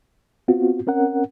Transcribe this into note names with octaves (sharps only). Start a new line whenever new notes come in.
B3 C4 F4 F#4
C4 C#4 A#4 F#5